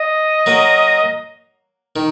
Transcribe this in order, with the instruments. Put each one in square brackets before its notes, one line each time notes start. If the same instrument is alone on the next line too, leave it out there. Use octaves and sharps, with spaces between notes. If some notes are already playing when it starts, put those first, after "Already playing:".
Already playing: [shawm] D#5
[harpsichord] F#3 A#3
D#3